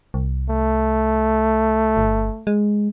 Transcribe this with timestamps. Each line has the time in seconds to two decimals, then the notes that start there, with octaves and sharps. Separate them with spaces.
0.14 C2
0.50 A3
1.97 G1
2.47 G#3